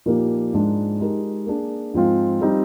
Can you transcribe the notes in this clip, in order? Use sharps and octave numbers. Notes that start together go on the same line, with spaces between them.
A#2 F3 A#3 D#4 G4
G#2 F3 G#3 D4
G#3 D#4 G4 A#4
A#3 D4 G#4
G#2 F3 G#3 C4 F4
G3 C4 D#4